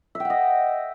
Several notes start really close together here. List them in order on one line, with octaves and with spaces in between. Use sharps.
E5 G5 F#5 D#5